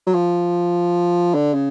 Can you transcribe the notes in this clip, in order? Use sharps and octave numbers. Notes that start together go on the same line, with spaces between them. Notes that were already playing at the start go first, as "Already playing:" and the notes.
F#3
F3
D3
C#3